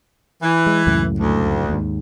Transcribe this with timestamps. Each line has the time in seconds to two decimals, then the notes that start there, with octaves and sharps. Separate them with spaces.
0.42 E3
0.66 G#3
0.87 C#2 F#2 A2
1.20 D2
1.69 D#2 G#2